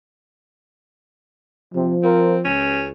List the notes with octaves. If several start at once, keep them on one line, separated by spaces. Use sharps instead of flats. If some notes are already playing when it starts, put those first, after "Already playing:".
C3 F3
C4 F4 A#4
C#2 C#4